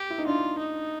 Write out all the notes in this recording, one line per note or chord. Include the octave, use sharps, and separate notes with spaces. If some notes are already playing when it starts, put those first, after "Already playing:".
Already playing: G4
E4
D#4
D4 F4
D#4